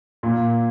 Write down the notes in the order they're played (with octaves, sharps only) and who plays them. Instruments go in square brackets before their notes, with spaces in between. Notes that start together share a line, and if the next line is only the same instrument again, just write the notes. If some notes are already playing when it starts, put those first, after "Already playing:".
[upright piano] A#2